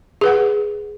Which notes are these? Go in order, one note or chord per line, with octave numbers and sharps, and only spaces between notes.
G#4 B4 F#5